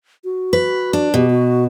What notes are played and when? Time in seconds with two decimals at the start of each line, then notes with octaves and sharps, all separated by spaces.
0.24 F#4
0.53 B4
0.93 D4
1.14 B2 G4
1.30 F#4